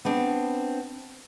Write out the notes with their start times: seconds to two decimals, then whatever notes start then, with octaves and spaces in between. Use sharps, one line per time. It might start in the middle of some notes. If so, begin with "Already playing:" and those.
0.05 B3 C4 D4